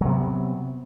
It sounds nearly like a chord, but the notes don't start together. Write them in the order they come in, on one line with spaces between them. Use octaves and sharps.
F#3 C3 B3